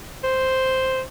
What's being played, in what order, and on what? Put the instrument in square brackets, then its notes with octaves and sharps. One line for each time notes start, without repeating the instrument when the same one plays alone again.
[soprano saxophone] C5